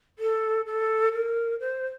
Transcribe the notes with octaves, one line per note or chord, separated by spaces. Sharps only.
A4
A4
A#4
C5